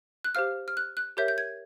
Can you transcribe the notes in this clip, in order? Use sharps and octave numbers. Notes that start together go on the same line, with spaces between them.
F#6
G4 C5 F5 F6
F6
F#6
F#6
G4 A#4 C#5 E5 G6
G6
G#6